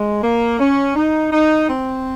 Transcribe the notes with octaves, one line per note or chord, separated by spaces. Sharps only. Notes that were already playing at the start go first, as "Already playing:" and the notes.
Already playing: G#3
A#3
C#4
D#4
D#4
C4